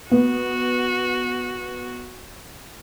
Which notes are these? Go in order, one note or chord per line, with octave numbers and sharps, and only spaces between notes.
B3 F#4